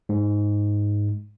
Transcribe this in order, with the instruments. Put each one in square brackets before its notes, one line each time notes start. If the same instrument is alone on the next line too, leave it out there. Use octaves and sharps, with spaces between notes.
[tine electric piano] G#2